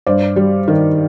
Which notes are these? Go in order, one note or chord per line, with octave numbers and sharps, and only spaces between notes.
G2 C5 D5
G3
D#3